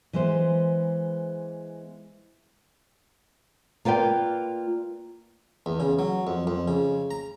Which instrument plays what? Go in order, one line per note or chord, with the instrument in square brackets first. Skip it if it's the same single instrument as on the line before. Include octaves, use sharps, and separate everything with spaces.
[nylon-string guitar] E3 G#3 B3 C5
A#3 F4 B4 D5 G5
[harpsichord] E2
C#3
F#3
F2
F2
C#3
A#5